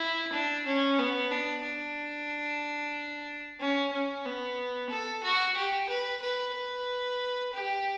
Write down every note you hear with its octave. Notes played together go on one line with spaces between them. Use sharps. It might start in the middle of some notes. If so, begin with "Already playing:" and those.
Already playing: E4
D4
C#4
B3
D4
D4
C#4
C#4
B3
A4
F#4
G4
B4
B4
B4
G4